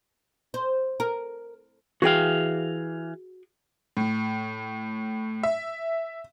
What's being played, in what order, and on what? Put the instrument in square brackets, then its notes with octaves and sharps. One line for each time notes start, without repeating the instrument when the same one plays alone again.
[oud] C5
A#4
[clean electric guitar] E3 F5 [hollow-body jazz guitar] F#4 G#4 G5
[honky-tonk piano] A2
E5